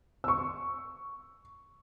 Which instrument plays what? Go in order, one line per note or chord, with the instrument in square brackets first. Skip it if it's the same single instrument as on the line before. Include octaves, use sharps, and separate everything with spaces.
[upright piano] C#6 E6